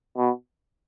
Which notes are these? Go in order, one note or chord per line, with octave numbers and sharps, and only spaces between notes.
B2